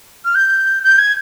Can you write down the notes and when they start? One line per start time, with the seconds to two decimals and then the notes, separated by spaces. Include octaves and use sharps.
0.25 F6
0.35 G6
0.84 G6
0.98 G#6